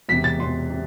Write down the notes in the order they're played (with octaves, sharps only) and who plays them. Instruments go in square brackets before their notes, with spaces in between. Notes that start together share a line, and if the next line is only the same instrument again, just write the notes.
[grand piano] E1 E2 C3 B6
A6
E1 E2 C3 C6
C3